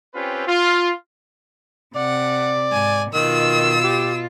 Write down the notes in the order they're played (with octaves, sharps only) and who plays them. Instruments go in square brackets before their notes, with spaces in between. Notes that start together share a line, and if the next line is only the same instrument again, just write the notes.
[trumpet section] C4 C#4 F4 G4 B4
F4
[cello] C3 [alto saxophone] D5 [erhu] F#5
[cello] G#2 [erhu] G#5
[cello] B2 F4 [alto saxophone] D#3 [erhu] E6
[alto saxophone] G4